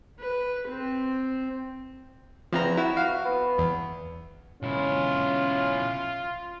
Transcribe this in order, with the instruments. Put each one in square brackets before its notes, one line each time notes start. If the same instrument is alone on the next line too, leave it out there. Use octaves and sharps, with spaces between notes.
[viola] B4
C4
[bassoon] E2 [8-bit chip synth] F3 C4 A#5
[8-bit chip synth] E4 [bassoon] F#4
[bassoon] F#4 [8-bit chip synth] F5
[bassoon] B3
[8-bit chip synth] E2
[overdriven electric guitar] B1 E4 [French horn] C#4 [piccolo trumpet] F4